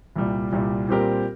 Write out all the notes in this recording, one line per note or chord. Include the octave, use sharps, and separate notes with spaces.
C2 A#2 G3
C2 A#2 G3
A#2 G3 C4 G4 A#4